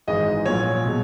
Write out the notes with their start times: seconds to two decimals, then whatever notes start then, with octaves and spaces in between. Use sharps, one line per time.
0.07 G#1 G#2 E3 G#3 D#5
0.46 A#1 A#2 F#3 C#5
0.86 B2 G#3